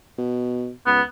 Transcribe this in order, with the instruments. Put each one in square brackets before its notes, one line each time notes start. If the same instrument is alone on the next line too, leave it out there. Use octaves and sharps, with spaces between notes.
[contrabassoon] B2
[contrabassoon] C#2 [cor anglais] B3